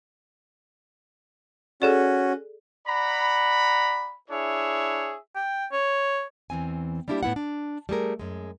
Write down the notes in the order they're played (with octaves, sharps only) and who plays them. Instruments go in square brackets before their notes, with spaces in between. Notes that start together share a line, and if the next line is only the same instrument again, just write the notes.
[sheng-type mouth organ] C#4 F#4 [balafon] G#4 A4 D5
[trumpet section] D5 F#5 A#5 B5
D4 E4 G#4 C#5 E5
[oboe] G5
C#5
[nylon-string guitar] E2 E3 C4 G#5
G3 A#3 D4 E4 F#4 G4
A2 B3 E4 F#5
D4
G3 A3 G#4 A#4
F#2 G#3